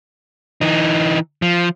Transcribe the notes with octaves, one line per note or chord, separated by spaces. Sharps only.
E3 D#4
F3